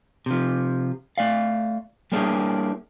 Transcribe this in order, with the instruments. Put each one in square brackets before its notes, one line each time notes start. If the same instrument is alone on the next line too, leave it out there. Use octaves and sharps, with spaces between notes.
[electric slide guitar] C3 F3
A3 D5 F5
G3 A#3 C#4 D4 E4 G#4